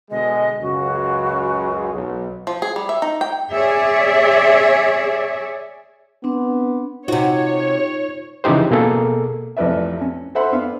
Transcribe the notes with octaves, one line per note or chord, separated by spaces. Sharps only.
B2 D3 G#3 D#5
C#2 F#2 C#3 F#4
B1
F3
G#4
G3
E5
D#4
G5
G#4 C#5 D5 E5
B3 C4 D4
C3 D#4 F4 F#4 C5 C#5
C#3 E3 F3 D#4 G4 C5
B2 A#3 G#4 A4
A1 F2 C3 B4 D5 E5
C#4
A4 C5 E5 F#5 B5 C6
B3 D4 F5